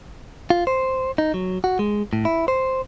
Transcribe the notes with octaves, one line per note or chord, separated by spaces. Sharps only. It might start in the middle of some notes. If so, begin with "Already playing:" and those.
F4
C5
D#4
F#3
F#4
G#3
A2
E4
C5